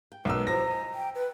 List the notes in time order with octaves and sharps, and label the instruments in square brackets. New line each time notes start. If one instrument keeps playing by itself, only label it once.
[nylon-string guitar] G5
[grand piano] B1 E6 [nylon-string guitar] A#3 B3 A#4 [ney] B4
[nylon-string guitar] E2 F3 G3 [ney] A#5 [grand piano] A#6
[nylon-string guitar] D#5 G#5
[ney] G5
B4